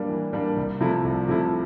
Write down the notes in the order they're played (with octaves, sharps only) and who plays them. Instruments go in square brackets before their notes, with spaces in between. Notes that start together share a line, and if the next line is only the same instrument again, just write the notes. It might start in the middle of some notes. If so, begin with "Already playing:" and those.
Already playing: [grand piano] G3 A#3 D4
E3
G3 A#3 D4
C2
C3 F3 A3 E4
C2
C3 F3 A3 E4